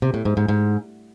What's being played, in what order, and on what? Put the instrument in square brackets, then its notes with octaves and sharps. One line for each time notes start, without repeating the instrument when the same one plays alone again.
[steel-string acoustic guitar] C3
A2
G#2
G#2
G#2